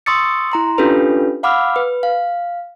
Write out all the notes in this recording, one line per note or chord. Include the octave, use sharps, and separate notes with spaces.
C6 C#6 D#6 E6 A6 C#7
E4 A#5 C6
C#4 D4 F4 G4 A4 B4
F5 F#5 B5 D6 E6 F6
B4
F5